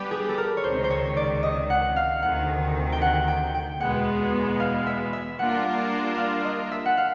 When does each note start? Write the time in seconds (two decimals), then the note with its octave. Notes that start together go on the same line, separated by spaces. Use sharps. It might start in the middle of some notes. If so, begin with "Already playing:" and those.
Already playing: G3 B3 D4 G4 B4
0.11 G#4
0.29 A4
0.38 A#4
0.57 C#5
0.64 C#2 C3 D#3 C5
0.84 C5
0.90 C#5
1.17 D5
1.43 D#5
1.70 F#5
1.96 F5
2.22 D2 C3 D#3 F#5
2.92 G5
3.02 F#5
3.28 G5
3.54 G5
3.80 E2 B2 G#3 B3 F#5
4.60 F5
4.87 E5
5.13 E5
5.39 G3 A#3 D4 F4 A#4 F#5
6.18 F5
6.45 D#5
6.71 E5
6.86 F#5
6.97 F5